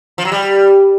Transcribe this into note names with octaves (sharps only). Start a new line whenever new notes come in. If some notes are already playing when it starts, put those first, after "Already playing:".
F3
F#3
G3